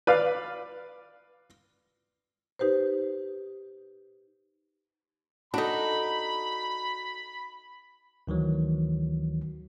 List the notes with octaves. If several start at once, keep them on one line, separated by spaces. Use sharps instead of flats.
B4 D5 F5
D#4 G4 B4 C5
D4 D#4 F#4 A4 B5
D2 D#3 E3 F#3